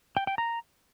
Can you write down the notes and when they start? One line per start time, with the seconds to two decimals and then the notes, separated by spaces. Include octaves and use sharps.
0.17 G5
0.27 G5
0.38 A#5